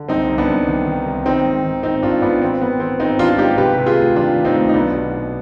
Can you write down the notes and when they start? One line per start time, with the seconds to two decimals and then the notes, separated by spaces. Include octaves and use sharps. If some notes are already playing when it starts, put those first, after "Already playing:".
Already playing: D3
0.09 C2 C4 D#4
0.28 C2
0.38 B3 D4
0.48 C2
0.67 D#3
0.86 D#3
1.06 C2
1.25 D#3 C4 D#4
1.45 G#2
1.64 D#3
1.83 G#1 C4 D#4
2.02 G#1 D4 F4
2.22 G#1 B3 D4
2.42 D#3 C4
2.61 D#3 B3
2.80 D#3 C4
2.99 G#1 C4 D#4
3.19 D#3 D4 F4
3.29 F4
3.38 G#2 D#4 G4
3.57 C3 G4 B4
3.77 C3
3.86 F4 G#4
3.97 D2
4.16 D#3 D4 F4
4.36 D#3
4.45 C4 D#4
4.55 D2
4.69 D#4
4.74 B1 B3 D4
4.94 B2
5.12 B2